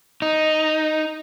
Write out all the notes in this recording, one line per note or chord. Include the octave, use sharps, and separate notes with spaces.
D#4